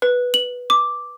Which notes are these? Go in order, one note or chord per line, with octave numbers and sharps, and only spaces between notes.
B4
F#7
D6